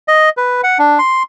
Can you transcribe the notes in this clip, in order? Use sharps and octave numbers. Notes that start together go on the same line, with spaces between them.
D#5
B4
F#5
D4
C6